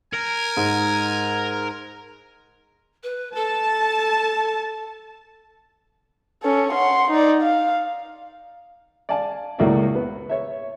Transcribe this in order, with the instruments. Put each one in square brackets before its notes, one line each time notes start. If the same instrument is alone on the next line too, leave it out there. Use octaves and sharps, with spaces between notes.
[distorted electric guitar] A#4 [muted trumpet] G#5
[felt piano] G#2
[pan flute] B4
[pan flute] A4 [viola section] A5
[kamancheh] C#4 A4
F#5 C6
D#4 D5
F5
[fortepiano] D5 F5 G#5 A5
C#2 A2 A#3 F#4 D5 E5
B3
C#5 E5